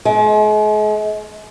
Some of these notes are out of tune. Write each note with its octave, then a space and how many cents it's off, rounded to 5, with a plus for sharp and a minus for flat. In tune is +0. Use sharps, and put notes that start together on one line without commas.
G#3 +40